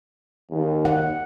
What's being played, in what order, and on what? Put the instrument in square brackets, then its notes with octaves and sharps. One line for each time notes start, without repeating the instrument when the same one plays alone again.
[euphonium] D#2
[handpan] F#5